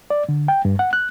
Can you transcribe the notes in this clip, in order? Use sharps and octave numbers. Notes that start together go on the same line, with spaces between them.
D5
D3
G5
G2
F#5
F#6